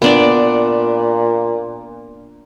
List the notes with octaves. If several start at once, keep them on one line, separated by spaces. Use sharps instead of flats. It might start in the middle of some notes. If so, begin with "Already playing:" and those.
A#2 B3 D4 D5